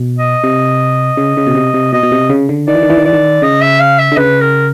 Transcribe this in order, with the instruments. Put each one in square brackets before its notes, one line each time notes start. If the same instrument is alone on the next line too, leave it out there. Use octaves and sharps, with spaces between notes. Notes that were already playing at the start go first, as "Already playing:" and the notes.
Already playing: [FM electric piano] B2
[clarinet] D#5
[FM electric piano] C3
C#3
C#3
B2
C3
C3
[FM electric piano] B2 [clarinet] D#5
[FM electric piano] B2
C3
C#3
D3
[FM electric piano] D#3 [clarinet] D5
[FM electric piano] E3
D#3
E3
D#3
[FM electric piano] E3 [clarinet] D5
[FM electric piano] D#3
[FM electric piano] C#3 [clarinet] D#5
[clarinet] E5
F5
E5
[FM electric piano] D3
[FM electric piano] C#3 [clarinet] B4
[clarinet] A#4